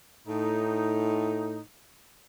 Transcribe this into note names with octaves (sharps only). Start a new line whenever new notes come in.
A2 D#4